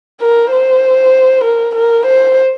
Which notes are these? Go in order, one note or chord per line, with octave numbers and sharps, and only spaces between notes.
A#4
C5
A#4
A#4
C5